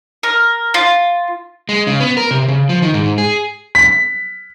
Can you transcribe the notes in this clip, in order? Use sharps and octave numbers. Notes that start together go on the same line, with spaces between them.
A#4
F4
G#3
C#3
B3
A#4
C3
C#3
F3
D#3
G#2
G#4
B6